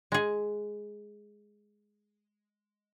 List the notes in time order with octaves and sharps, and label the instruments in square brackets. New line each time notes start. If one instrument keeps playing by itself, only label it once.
[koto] G#3 G#4